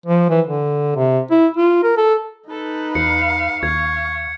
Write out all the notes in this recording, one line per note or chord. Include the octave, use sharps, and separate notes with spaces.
F3
E3
D3
C3
E4
F4
A#4
A4
D#4 A4 B4
E2 F5 C#7
D#2 F5 C#6 G#6